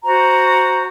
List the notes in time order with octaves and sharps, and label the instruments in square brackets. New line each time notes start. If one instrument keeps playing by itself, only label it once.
[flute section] F#4 C5 A#5